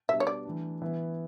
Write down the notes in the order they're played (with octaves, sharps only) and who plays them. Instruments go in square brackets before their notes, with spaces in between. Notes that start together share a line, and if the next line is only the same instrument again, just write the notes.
[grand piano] B2 G3 B3 D4 [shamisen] E5
[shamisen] C#5
D5
[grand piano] E3 A3 D4
E3 B3 E4